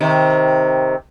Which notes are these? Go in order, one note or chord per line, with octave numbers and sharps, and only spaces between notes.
C3 D#3